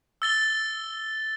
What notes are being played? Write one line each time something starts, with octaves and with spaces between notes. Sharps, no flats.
E6 A6 G7